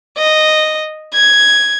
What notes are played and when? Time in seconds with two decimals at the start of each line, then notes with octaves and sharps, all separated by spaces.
0.17 D#5
1.14 G#6